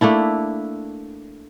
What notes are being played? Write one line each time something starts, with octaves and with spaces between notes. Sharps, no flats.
A3 A#3 D4 E4